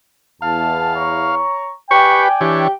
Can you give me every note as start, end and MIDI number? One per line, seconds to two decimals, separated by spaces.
0.42 1.45 40
0.42 1.35 77
0.42 0.94 81
0.96 1.73 73
0.96 1.73 82
0.96 1.73 85
1.91 2.28 67
1.91 2.28 71
1.91 2.60 74
1.91 2.72 79
1.91 2.60 80
1.91 2.23 85
2.41 2.68 52
2.41 2.68 62
2.41 2.71 67
2.41 2.68 73